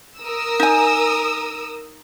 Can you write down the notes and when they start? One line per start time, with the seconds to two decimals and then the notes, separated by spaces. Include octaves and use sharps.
0.19 A#4 D#6 E6
0.60 D#4 G#5